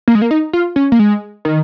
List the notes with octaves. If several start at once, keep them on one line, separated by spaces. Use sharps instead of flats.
A#3
G#3
A#3
D#4
F4
C#4
A#3
G#3
D#3